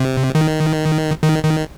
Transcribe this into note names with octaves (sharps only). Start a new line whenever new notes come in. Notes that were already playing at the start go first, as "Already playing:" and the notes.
Already playing: C3
D#3
D#3
D#3